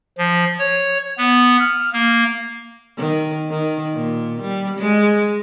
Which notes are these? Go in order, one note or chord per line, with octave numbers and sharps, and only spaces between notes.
F3
C#5
B3
F6
A#3
D#3
D#3
A#2
G3
G#3